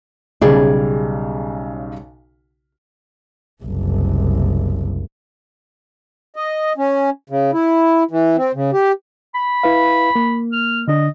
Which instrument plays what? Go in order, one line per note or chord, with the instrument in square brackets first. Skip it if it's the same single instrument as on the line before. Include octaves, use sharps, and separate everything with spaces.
[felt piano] B1 C#3 [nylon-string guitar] G3 G#4 D5
[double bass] F#1 C2
[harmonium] D#5
C#4
C#3
E4
E3
C4
C#3
G4
[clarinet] B5
[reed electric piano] E4 B4 F5
A#3
[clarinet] F6
[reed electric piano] D3 D4 [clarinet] D#5